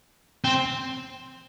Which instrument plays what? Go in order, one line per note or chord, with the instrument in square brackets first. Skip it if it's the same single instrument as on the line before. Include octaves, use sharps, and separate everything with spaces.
[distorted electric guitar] C4